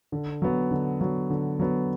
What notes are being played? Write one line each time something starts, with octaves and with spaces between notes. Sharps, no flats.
D3
F#3 B3
D3
F#3 B3
D3
F#3 B3